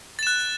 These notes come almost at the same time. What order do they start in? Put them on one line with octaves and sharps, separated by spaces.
A6 E7 F#6